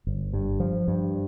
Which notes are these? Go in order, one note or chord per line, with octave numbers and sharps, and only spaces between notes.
G1
G2
F3
G2